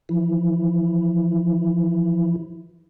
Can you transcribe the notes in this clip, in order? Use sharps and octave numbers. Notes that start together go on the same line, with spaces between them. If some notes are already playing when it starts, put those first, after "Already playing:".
E3 F3 E4